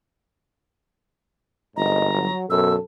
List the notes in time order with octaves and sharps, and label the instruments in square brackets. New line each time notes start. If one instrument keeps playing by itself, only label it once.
[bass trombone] G1 [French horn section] G#2 A#3 D#5 [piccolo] A#5
[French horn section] F#3
[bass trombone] F#2 [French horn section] B2 [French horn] A4 [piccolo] E6